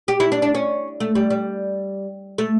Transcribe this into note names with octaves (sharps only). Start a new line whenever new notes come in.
G4
E4
D4
D4
C#4
A3
G3
G3
A3